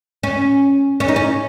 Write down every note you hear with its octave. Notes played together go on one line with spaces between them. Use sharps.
C#4
C#4
D#4
C#4